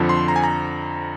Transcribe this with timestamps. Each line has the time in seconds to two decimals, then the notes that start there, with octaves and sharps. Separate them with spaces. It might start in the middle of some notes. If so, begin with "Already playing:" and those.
Already playing: F2 D3 F3
0.09 C6
0.28 A#5
0.36 G#5
0.44 A#5